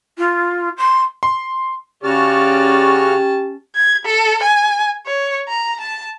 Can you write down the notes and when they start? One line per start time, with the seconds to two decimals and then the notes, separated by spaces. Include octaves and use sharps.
0.18 F4
0.77 C6
1.23 C6
2.04 C#3 C#4 F#4 G4 D5 A5 F6
3.75 G#6
4.05 A4
4.43 G#5
5.06 C#5
5.48 A#5
5.81 A5